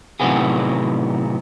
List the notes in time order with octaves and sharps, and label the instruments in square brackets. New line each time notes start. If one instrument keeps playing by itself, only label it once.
[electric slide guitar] A2 C3 D#3 F#3 B3 G#4